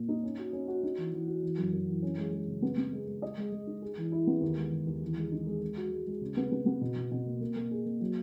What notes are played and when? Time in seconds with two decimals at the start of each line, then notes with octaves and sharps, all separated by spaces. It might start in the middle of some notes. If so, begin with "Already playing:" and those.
Already playing: A#2 A#3
0.09 D#4
0.23 C#4
0.38 F#4
0.53 C#4
0.68 F#4
0.83 D#4
0.98 E3
1.13 E3
1.28 F#4
1.43 E3
1.58 F#2
1.73 F#2
1.88 E3
2.03 C#4
2.18 G#3
2.33 G#3
2.48 C#3
2.62 B3
2.78 B3
2.93 G#3
3.08 G#3
3.22 D#5
3.37 G#3
3.52 G#3
3.67 D#4
3.82 G#4
3.97 E3
4.12 E4
4.27 B3
4.42 D#2
4.57 G#3
4.72 D#2
4.87 D#2
5.02 E3
5.17 G#3
5.32 D#4
5.47 G#3
5.61 G#3
5.77 F#4
5.92 G#3
6.07 G#3
6.21 C#3
6.37 B3
6.52 B3
6.66 B3
6.81 B2
6.96 B2
7.11 B2
7.26 A#3
7.41 A#3
7.56 A#3
7.71 G#4
7.86 A#3
8.01 F#3